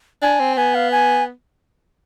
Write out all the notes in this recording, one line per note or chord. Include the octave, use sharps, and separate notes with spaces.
D4 G#5
C4
B3 G#5
F5
G#5